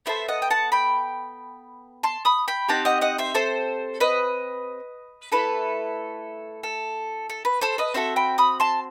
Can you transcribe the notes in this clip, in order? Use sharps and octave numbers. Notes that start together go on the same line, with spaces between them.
B3 F#4 A4 C5 E5
D#5 F#5
G5
F#5 A5
G5 B5
A5 C6
B5 D#6
G5 B5
C4 D#4 G4 F#5 A5
D#5 F#5
D#5 F#5
C5 E5
A4 C5
B4 D#5
A3 E4 A4 B4
A4
A4
B4
A4 C5
B4 D#5
C4 F#4 A4 C5 E5
G5 B5
B5 D#6
A5 C6